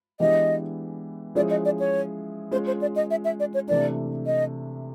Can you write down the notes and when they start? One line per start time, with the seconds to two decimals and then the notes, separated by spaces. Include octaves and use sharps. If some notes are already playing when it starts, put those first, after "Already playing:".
0.20 E3 G#3 B3 D4 G4 D#5
1.35 F3 G#3 C#4 E4 G#4 D5
1.50 D#5
1.65 D5
1.79 C#5
2.51 G#3 C#4 F4 C5
2.67 C5
2.81 D5
2.96 D#5
3.11 E5
3.25 E5
3.40 D5
3.54 C#5
3.68 C3 E3 A3 D4 D5
4.26 D#5